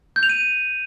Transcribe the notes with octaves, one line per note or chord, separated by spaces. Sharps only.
G6
F7
D#7